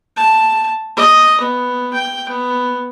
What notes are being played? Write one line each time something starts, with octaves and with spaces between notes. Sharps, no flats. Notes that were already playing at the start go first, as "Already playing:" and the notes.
A5
D#5
B3
G5
B3